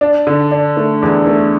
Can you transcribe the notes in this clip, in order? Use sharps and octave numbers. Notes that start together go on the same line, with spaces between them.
D4
D3
D4
A3
E2
A3